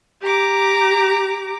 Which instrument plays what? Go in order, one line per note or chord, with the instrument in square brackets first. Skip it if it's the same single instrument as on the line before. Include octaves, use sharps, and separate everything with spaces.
[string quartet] G4 A#5 D6